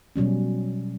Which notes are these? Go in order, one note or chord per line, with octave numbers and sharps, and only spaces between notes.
B2 F#3 G3 C#4